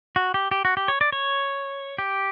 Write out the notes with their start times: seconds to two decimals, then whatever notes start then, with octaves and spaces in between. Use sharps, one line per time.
0.16 F#4
0.34 G4
0.51 G4
0.65 F#4
0.77 G4
0.88 C#5
1.01 D5
1.12 C#5
1.99 G4